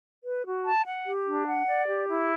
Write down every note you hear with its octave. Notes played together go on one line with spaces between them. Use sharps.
B4
F#4
A5
F#5
G4
D4
F#5
D5
G4
E4